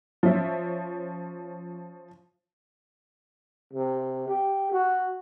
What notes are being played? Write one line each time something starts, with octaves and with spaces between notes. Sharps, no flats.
F3 C#4 E5
C3
G4
F#4